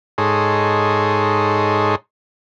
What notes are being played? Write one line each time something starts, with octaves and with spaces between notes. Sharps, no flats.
G#2 D#4 G#4 A4 C#5 C6